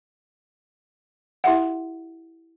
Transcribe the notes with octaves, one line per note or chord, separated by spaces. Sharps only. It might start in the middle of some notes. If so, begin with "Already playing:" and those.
E4 G4 E5 F#5